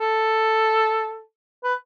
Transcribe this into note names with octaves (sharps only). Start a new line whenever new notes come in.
A4
B4